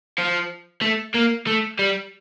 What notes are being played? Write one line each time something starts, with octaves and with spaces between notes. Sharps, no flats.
F3
A3
A#3
A3
G3